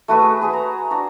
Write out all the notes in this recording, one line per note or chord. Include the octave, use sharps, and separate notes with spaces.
A3 F#4 B4 E5
G#4
F#4 G#4 B4
A#5
D4 F#4